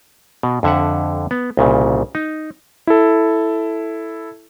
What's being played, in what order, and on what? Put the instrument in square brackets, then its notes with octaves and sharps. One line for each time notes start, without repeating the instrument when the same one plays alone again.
[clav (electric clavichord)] B2
F2 D3 E5 F#5
B3
C2 A#2 C#3
D#4
[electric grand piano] E4 A4